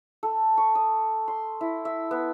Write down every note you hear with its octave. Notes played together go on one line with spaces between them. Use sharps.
A4
C#6
D#6
C6
E4
E5
B3